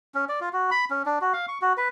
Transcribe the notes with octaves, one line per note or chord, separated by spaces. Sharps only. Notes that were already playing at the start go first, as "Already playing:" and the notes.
C#4
D5
F4
F#4
B5
C#4
D4
F#4
F5
C#6
F#4
B4